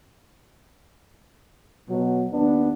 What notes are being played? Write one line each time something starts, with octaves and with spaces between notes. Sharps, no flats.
B2 F#3
D#2 B3 D4